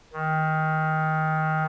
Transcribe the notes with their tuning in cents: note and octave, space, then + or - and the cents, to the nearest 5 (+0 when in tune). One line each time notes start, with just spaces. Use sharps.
D#3 +15